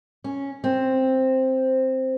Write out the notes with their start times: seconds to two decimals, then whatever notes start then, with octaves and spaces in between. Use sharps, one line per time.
0.24 C#4
0.64 C4